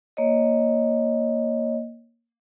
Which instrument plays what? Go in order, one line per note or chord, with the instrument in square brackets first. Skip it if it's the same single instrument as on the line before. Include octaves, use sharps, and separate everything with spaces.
[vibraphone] A#3 C#5 D#5